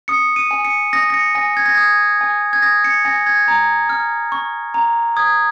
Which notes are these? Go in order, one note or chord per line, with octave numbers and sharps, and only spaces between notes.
D#6 C#7
D#7
G#5
C#7
D#6 A#6
A#6
C#7
G#5 A#6
G#6
A#6
D#6 G#6
G#5
G#6
D#6 A#6
C#7
G#5 A#6
G#6
A#5
F6
C#6
A#5
D#6 G#6